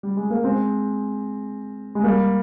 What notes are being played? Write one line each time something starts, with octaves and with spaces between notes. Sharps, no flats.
G3
G#3
A#3
G#3 C4
G#3
G3 A#3